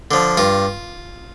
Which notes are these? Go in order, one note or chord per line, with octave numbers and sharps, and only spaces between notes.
D3 F3
G2 F4